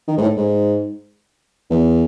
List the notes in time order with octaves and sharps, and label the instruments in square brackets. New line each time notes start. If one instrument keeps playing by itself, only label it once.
[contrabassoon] D#3
G#2
A2
G#2
E2